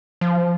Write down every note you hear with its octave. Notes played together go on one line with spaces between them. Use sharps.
F3